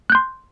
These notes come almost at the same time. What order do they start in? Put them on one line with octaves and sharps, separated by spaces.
F#6 G6 C6